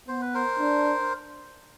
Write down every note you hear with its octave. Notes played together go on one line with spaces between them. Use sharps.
B3 C5
B4
A#4 C5
D4